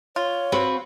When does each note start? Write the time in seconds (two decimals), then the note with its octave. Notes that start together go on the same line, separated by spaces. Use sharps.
0.16 F4 C#5
0.52 C4 F#4 B4